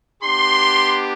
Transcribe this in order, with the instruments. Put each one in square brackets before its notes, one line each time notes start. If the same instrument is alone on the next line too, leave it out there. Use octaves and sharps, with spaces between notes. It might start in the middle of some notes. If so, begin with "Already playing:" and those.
[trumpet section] B3 D4 G4 C6